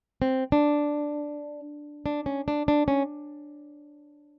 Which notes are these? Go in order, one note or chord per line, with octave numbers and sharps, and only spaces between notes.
C4
D4
D4
C#4
D4
D4
C#4